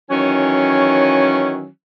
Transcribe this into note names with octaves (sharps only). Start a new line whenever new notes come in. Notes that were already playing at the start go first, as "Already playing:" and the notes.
D#3 E3 F#3 C#4